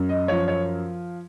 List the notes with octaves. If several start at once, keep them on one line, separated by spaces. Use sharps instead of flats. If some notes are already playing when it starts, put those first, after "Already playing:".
Already playing: F#2
D#5
F3 C#5
C#5